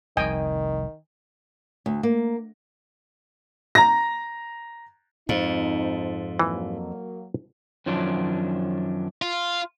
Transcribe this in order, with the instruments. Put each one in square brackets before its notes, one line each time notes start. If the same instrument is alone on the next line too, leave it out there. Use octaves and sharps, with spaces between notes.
[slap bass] F1 C2 [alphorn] D#3 [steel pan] D#5 G5 G#5
[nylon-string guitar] D2
A#3
[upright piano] A#5 A#6
[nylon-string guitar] F2 [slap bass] G#2 [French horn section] C4 D#4
[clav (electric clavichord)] E3 [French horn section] F#3 A#3
[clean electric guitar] F#2 D#3 F3 F#3 D4
[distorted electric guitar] F4